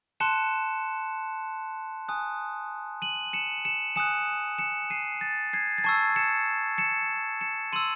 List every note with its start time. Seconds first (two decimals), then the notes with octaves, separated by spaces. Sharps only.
0.20 A5 C6 F#6 C#7 E7
2.08 G#5 D#6 F#6
3.02 D#7 F#7
3.33 C#7 E7
3.65 C#7 E7
3.96 G#5 D#6 F#6 C#7 E7
4.58 C#7 E7
4.90 C7 D#7
5.21 A6
5.53 G#6 C7
5.78 A6
5.84 A5 C#6 E6 G#6 C7
6.16 C#7 E7
6.78 C#7 E7
7.41 C#7 E7
7.72 C6 E6 D#7 F#7